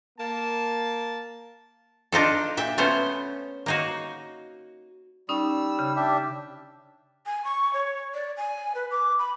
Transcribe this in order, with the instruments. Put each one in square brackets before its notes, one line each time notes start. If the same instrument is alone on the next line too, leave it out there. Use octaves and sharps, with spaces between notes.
[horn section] A#3 A5
[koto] D4 D#4 F4 A4
A#2 E5 G5
A3 B3 C#4 C5
A#3 D#4 F#4
[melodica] G3 E6 [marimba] C#4 D#4
[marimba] C#3
[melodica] D4 G4 E5
[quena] G#5
C#6
C#5
D5
G#5
B4
D6
B5